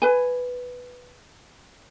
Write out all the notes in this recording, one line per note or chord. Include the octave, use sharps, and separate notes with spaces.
B4 G#5